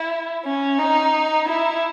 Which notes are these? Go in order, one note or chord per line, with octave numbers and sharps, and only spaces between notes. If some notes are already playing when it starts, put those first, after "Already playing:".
Already playing: E4
C#4
D#4
E4